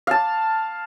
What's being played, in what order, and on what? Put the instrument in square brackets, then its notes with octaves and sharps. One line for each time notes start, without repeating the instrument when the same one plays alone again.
[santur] F5 A5